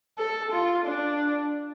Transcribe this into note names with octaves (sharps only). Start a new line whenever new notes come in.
A4
F4
D4